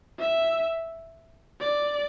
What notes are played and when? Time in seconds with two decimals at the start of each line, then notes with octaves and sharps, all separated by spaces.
0.19 E5
1.60 D5